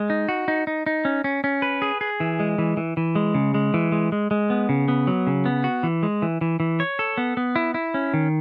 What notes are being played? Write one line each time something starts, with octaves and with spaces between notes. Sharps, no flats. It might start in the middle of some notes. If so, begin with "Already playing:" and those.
Already playing: G#3
D#4
F#4
D#4
D#4
D#4
C#4
C#4
C#4
B4
G#4
G#4
E3
G#3
E3
E3
E3
G#3
C#3
G#3
E3
G#3
G#3
G#3
B3
C#3
B3
F#3
C#3
B3
F#4
E3
G#3
E3
E3
E3
C#5
A4
B3
B3
E4
E4
C#4
D#3